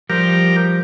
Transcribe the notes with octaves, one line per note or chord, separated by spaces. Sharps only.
F3 G3 G4 A#4 C5